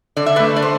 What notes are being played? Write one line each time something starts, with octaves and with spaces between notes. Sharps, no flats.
D3 D5
E5
B4 D5
A3
D5
C5